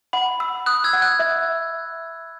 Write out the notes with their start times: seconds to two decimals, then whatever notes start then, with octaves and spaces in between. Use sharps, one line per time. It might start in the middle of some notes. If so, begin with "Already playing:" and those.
0.13 F#5 B5
0.40 E6
0.66 D#6 F#6
0.84 E6 G#6
0.93 F#5
1.02 F#6
1.19 E5